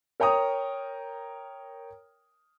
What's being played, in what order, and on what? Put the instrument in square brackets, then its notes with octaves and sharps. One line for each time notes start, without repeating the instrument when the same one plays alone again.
[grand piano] A#4 C#5 G5 A#5 D#6